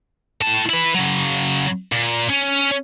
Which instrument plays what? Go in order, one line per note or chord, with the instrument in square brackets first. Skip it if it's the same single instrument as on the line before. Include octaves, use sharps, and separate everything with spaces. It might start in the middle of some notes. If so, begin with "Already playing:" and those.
[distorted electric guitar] A2 A5
E4 B4
C#3 F#3
A#2
C#4